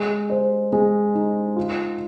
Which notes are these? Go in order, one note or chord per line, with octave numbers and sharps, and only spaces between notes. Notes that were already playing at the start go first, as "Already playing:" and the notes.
Already playing: G#3
C5
G#3
D#4
F4